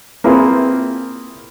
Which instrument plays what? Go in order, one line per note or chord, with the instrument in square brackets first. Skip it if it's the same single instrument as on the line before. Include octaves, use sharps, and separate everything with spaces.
[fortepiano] A#3 C4 E4 F4 G#4 B4